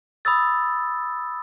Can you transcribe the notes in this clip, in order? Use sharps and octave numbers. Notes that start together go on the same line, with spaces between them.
B5 D#6 E6 A6